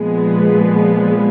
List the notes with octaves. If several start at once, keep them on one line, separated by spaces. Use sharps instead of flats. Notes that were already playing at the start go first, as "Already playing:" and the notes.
Already playing: A#2 F3 G#3 B3